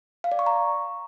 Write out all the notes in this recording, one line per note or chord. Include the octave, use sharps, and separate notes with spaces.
F5
D5
C#6
A#5